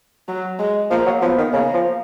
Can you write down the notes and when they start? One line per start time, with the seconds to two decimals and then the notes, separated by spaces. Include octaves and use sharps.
0.28 F#3
0.59 G#3
0.90 F3 A#3
1.06 F#3
1.21 F3 B3
1.38 D#3
1.53 C#3 A#3
1.74 F3